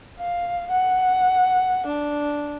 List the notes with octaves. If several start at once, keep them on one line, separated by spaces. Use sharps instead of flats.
F5
F#5
D4